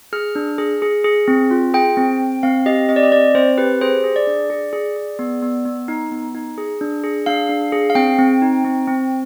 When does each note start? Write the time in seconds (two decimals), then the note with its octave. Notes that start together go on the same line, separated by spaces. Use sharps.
0.13 G#4 F6
0.35 D4
0.58 G#4
0.82 G#4
1.04 G#4
1.28 C4
1.51 F4
1.74 G#4 G5
1.97 C4
2.20 C4
2.43 C4 F5
2.66 G4 D#5
2.89 C4 D#5
2.96 D5
3.03 D#5
3.12 C4 D5
3.35 C4 C5
3.58 G4 B4
3.81 G#4 C5
4.04 G#4
4.16 D5
4.27 D4
4.50 G#4
4.73 G#4
4.97 G#4
5.19 B3
5.42 B3
5.65 B3
5.88 D#4
6.11 B3
6.35 D#4
6.58 G#4
6.81 D4
7.04 G#4
7.26 D4 F5
7.49 D4
7.72 G#4
7.90 F5
7.95 C4 G5
8.19 C4
8.42 D#4
8.65 C4
8.87 C4